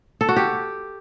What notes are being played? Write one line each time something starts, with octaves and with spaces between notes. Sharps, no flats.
A4
F#4
G4